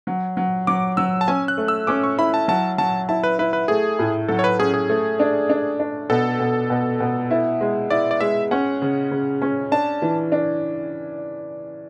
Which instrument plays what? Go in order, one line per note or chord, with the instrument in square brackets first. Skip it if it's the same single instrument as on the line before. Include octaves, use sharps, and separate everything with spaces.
[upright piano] F#3
F#3
[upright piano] F#3 [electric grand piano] D6
[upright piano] F#3 [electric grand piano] E6
[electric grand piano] A5
[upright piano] C#4 [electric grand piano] G#5
[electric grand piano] F#6
[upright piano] A3
[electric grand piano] E6
[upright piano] C#4 [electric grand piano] D6
[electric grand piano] C#6
[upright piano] E4 [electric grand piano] B5
[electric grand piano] A5
[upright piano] F#3 [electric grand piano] A5
[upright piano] F#3 [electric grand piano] A5
[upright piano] E4 [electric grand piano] A5
[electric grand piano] B4
[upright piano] E4 [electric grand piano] B4
[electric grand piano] B4
[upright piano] A3 [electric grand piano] G#4
[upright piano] A2
[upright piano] F#3 [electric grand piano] A4
[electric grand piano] C#5
B4
[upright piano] C#4 [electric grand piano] G#4
[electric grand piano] G#4
[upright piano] A3
D4
D4
D4
[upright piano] B2 [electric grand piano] A4
[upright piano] B2
B2
B2
E4
G#3
[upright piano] E4 [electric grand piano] D5
[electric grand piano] D5
[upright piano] G#3 [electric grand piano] E5
[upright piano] C#4 [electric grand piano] F#5
[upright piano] C#3
C#3
C#4
[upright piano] D4 [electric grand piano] A5
[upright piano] E3
D4